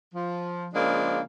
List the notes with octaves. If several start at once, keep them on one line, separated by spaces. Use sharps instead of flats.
F3
C#3 F3 G#3 A#3 D4